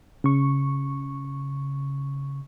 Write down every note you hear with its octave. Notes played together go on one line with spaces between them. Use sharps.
C#3 C#6